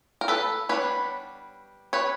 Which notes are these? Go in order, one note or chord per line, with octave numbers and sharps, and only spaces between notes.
A#4
A4 B4
G3 B3 D4 B4 C#5
B4 C#5